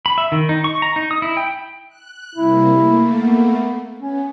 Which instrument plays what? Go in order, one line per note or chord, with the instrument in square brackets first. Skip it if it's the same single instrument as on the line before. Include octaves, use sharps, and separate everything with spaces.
[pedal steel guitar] B5
E5
D#3
D#4
C#6
A#5
D#4
D#6
E4
G5
[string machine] F#6
[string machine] C3 G3 A#3 [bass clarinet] E4
[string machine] A3 A#3
[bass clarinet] B3
[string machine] B3 [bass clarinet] C#4